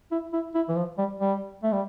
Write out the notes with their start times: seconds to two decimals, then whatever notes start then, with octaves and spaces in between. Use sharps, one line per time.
0.11 E4
0.33 E4
0.55 E4
0.69 E3
0.76 F3
0.98 G3
1.20 G3
1.63 A3
1.72 G3